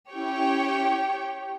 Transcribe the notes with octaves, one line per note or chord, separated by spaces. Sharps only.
C#4 E4 G4 C#5 G5